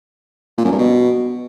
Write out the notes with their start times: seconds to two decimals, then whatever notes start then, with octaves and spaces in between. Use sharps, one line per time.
0.58 A#2
0.65 F#2
0.71 G2
0.78 B2